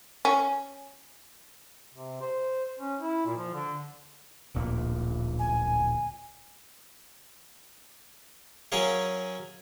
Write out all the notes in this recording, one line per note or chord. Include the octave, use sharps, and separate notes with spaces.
C#4
C3
C5
C#4
E4
A#2
F3
D3
D1 A#1 A#2
G#5
F#3 C#4 G#4 A#4 C#5 F5